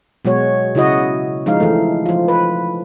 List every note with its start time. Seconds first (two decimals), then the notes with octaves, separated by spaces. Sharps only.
0.25 B2 F#3 G#3 F#4 C#5
0.75 C#3 E4 F#4 D#5
1.46 F3 G#3 D#4 F5
1.60 E3 A3
2.06 F3 F4
2.28 B4